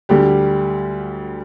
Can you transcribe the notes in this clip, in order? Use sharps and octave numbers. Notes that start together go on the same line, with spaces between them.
D2 D3 G3 G4